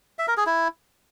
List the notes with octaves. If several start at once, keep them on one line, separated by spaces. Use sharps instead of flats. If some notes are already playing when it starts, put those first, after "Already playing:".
E5
A#4
G#4
E4